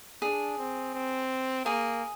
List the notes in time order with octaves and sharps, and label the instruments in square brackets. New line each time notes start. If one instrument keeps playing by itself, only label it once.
[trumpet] D4 [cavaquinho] G#4
[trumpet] C4
C4
[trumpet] A#3 [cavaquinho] G#4